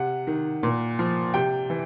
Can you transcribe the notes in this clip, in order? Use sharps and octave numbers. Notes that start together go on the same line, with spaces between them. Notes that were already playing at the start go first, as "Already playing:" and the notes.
Already playing: C3 F#5
D#3
A#2
F3
C3 G5
E3